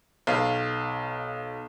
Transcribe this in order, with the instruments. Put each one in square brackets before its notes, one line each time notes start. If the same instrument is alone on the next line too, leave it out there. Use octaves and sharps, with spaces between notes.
[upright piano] B1 F5